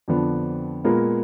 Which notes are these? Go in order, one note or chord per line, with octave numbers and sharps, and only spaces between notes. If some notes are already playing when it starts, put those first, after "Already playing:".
F2 D3 F3 B3 D4
A#2 G#3 B3 F4 A#4